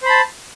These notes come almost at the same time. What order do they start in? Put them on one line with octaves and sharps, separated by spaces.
C5 B5 A5